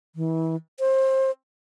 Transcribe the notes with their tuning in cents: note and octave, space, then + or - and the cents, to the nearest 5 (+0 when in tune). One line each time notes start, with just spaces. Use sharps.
E3 -30
C5 +25